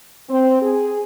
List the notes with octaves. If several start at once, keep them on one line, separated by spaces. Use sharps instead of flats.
C4
G#4